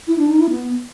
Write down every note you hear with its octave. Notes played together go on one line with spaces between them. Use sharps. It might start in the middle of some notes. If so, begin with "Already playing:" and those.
E4
D4
D#4
E4
B3